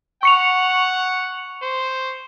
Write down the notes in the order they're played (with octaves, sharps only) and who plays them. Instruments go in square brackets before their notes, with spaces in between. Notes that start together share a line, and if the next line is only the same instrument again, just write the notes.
[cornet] F#5 [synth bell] C#6 C#7 F7
[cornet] C5